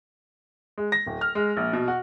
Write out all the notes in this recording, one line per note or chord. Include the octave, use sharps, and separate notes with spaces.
G#3
A#6
D1
F6
G#3
A#1
B2
F#4